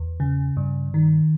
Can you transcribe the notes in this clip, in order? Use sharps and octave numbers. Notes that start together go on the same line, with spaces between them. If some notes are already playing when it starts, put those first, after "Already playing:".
Already playing: E2
C#3
G2
D#3